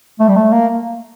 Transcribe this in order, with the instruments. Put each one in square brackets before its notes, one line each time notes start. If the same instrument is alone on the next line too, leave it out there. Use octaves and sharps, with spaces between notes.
[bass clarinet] A3
G3
A3
A#3